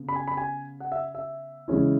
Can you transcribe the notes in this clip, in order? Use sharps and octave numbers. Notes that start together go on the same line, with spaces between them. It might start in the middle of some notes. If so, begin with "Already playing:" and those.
Already playing: C#3 B3
B5
G#5
B5
G#5
F#5
E5
E5
E2 C#3 G#3 C#4 E4